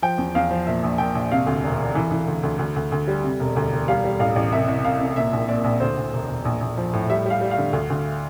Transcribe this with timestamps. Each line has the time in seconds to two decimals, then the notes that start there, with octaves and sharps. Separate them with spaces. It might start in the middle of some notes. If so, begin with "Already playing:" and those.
0.02 F3 G5
0.18 E2
0.35 E2 F5
0.51 F3
0.66 A#2 E5
0.83 A#1
0.98 A#2 G5
1.15 A#1
1.31 C3 F5
1.46 D2
1.63 E1
1.79 E1
1.95 E3
2.11 E3
2.28 D2
2.43 D2
2.59 D2
2.76 D2
2.92 D2
3.08 G3
3.23 C3
3.40 E1
3.56 D2
3.72 E1
3.88 G3 F5
4.04 G3
4.19 A1 F5
4.36 A1
4.52 C2 E5
4.68 C2
4.84 C2 F5
5.00 C2
5.16 A#2 E5
5.33 A#1
5.48 A#2 D5
5.64 A#1
5.80 D2 C5
5.97 D2
6.13 E1
6.28 E1
6.45 A#1
6.61 A#1
6.78 F3
6.93 A2
7.10 G3 E5
7.26 G3 F5
7.41 G3
7.51 F5
7.57 D3
7.73 D2
7.90 D2